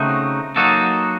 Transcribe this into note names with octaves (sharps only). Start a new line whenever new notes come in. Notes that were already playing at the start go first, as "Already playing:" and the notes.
Already playing: C#3 A3 C4 D#4 F#4
F#3 A#3 D#4 F#4 A4